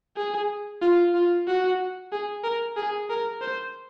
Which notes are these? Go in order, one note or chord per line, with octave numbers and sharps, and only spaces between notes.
G#4
F4
F4
F#4
G#4
A#4
G#4
A#4
C5